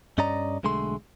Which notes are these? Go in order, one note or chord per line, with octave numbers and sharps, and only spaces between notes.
G2 C#4 D5 D#5 A#5
B1 D3 G#3 A3 C6